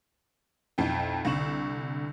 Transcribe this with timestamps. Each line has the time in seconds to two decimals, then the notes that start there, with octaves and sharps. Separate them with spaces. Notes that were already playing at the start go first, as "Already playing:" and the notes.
0.78 B1 F2 E4 G5
1.25 C2 D3 C#6 E7 F#7